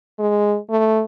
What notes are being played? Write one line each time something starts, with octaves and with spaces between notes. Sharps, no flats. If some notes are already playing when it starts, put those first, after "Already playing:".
G#3
A3